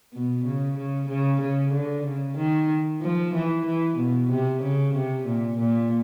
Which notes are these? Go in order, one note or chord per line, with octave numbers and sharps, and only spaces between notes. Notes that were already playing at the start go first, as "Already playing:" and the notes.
B2
C#3
C#3
C#3
C#3
D3
C#3
D#3
F3
E3
E3
B2
C3
C#3
C3
A#2
A#2